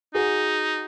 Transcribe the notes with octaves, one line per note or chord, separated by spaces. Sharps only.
D#4 F#4 G#4